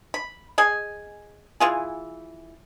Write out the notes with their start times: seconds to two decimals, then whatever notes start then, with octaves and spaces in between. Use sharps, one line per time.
0.14 B5
0.58 G#4 D#5 G#5
1.60 E3 F4 G#4